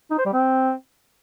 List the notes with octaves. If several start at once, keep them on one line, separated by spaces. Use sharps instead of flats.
D#4
C5
G3
C4